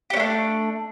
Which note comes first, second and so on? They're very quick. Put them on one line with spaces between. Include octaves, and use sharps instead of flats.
G4 C#4 A3 D4